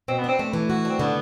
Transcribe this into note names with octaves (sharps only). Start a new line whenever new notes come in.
B2 C4
B3
C4 D4
A3
E3
F#4
C4 D4
D3 B3